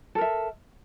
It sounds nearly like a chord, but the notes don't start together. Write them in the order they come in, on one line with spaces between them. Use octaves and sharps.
A4 A#4 E5